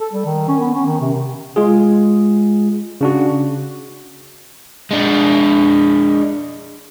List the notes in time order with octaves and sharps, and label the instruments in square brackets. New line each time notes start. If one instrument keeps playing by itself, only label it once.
[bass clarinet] A4
G3
D#3
C#4
B3
C#4
D#3
C3
C3
[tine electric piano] G#3 F4 G#4
C#3 D4 F#4
[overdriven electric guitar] G#3 D4